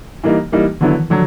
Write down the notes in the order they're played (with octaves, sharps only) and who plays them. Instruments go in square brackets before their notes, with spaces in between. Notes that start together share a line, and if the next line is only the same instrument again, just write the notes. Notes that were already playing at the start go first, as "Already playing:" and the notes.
[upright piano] E3 G3 A#3 D#4
E3 G3 A#3 D#4
[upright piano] D3 F#3 B3 E4 [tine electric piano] D#3
[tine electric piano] E3
[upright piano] D3 F#3 [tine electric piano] F3